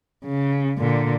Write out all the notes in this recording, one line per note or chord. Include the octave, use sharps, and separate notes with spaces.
C#3
A#2 D3